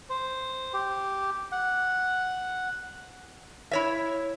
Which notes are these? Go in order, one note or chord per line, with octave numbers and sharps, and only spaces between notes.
C5
G4
F#5
E4 C#5 E5